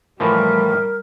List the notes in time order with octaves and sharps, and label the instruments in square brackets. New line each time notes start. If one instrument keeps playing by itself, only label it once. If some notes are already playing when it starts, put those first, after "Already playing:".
[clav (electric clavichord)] A2 E3 F3 [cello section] G3 [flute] A#4